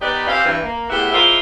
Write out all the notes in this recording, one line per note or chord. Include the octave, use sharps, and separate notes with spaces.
D#3 B3 D#4 G4 B4 D5
C4 C#4 G4 F5
G2 E3
A#3
A2 B3 E4 G4 G#4 F#5
G#3 A#3 E4 F4 A#4 C5